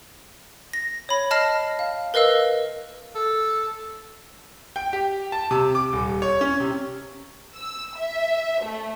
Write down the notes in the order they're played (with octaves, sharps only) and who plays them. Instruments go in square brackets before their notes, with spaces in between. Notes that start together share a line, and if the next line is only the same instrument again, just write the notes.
[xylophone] A#6
C#5 B5
D#5 A5 F6 A#6 C7
F5
A#4 B4 D#5 F5 E6
[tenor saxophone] A4
[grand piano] G5
G4
A5
C3
D6
D#1
C#5
C#4
C3
[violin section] E6
E5
A3